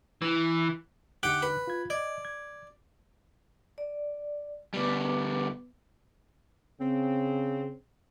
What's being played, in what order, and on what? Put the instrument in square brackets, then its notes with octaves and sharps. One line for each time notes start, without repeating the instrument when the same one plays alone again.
[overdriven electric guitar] E3
[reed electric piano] D3 D#4 F#6 [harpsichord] G4 F#5 G5
[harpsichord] B4
[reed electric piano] F4 G#6
[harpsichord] D5 [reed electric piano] D#5 G#6
[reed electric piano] G#6
[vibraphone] D5
[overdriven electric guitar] D2 G3 [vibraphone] B3 B4 D6
[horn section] C#3 C4